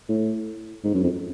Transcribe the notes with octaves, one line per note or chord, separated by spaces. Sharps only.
A2
G#2
F#2
F2